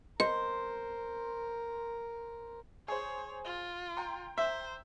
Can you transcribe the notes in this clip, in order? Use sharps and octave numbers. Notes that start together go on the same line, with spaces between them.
A#4 C5 D#5
G#4 C5 C#5
F4
G5 A#5 C6
C5 E5